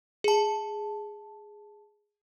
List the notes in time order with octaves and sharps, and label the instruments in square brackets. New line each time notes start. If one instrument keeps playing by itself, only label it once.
[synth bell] G#4 A5